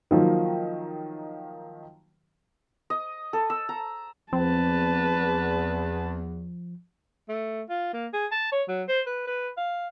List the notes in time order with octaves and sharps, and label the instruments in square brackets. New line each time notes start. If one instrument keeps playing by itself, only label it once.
[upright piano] D#3 F3 F#3 A#3
[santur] D#5
A4
E6
A#5
[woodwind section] E2 [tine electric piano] F3 [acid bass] C4 [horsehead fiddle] B4 A5
[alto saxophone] A3
F4
A#3
G#4
A5
C#5
F#3
C5
B4
B4
F5